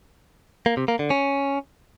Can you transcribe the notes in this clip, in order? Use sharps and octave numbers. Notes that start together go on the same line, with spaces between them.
A#3
C3
A#3
D3
C#4